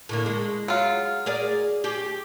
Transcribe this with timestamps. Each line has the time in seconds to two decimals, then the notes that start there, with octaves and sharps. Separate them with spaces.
0.09 A2 D3 A#3
0.26 G#3
0.68 F#3 F4
1.26 G#4 A#4 D5
1.84 G4 G#4